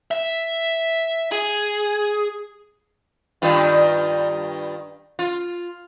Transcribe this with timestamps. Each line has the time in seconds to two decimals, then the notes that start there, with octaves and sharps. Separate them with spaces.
0.11 E5
1.32 G#4
3.42 G2 D#3 F4
5.19 F4